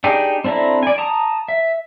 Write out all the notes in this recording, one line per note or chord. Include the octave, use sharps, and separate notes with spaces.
D4 D#4 G4 G#4
C4 D4 E4 A4 A#5
D5 G#5
A5 A#5 D#6
E5